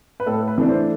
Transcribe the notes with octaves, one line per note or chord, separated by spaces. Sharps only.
B4
A2 A4
B4
E3 A3 D4
C5